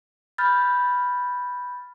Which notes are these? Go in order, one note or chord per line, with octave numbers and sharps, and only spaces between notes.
B5 F6 G6 A6